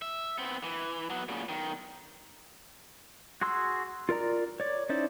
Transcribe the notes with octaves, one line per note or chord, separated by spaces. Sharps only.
E5
B3 C4
E3
F#3 B3
A#2 C#3
B1 D#3
F#4 G#4 C6 E6
F4 A#4 D5 A#5
C#5 D5
C#4 D#4 E4 C5 D5